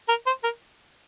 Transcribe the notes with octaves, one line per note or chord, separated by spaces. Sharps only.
A#4
C5
A#4